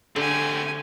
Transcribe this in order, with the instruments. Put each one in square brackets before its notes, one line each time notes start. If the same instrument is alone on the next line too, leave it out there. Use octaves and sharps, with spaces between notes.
[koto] D3 [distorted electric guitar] A3 C4 [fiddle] G4 G#5